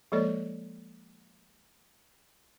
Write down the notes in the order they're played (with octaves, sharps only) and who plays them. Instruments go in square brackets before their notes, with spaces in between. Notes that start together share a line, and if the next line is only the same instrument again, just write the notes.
[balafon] F3 G#3 A#3 A4 C#5 D5